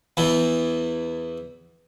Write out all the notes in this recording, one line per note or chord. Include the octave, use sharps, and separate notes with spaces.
E2 E3